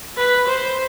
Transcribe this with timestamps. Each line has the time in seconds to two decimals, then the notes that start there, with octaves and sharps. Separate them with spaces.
0.17 B4
0.48 C5